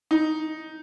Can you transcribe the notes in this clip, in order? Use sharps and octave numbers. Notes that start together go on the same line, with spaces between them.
D#4